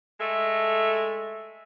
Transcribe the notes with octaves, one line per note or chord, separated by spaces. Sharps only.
G#3 A3 A4 E5